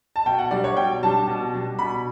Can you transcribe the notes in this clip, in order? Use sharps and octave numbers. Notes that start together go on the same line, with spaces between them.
A5
B2 G5
F#5
G3 D4 D5
C#5
B2 G5
G3 D4 A5
B2
G3 D4
B2 B5